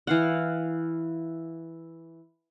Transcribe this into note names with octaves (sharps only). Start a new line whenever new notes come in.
E3 F5 F#5